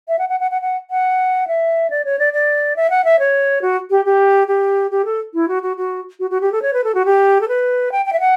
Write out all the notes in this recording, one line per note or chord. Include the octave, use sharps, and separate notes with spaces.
E5
F#5
F#5
F#5
F#5
F#5
F#5
E5
D5
C#5
D5
D5
E5
F#5
E5
C#5
F#4
G4
G4
G4
G4
A4
E4
F#4
F#4
F#4
F#4
F#4
G4
A4
C#5
B4
A4
F#4
G4
A4
B4
G5
G5
E5
F#5